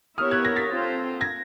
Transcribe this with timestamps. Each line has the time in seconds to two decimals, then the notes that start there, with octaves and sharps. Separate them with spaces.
0.18 B3 E4 G4 A#4 C#5 D#6 F6
0.31 F#6 G#6
0.44 G#6 A#6
0.56 A6 B6
0.69 C4 F4 A4 C5
1.21 G#6 A#6